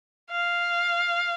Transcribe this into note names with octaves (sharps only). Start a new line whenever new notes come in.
F5